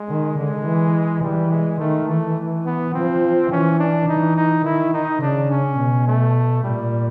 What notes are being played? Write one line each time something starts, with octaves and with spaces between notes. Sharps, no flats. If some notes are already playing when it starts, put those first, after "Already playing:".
Already playing: G#3
D#3
D3 G#3
E3
E3 G3
G#3
D#3 A3
E3 A3
B3
F3 C4
E3 C#4
D4
E3 D#4
D#4
D#3 E4
D#4
C#3 D4
C#4
B2
A3
A#2 G3